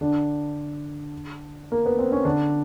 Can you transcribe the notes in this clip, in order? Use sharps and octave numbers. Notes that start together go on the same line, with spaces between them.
D3 D4
A#3
B3
C4
C#4
D3 D4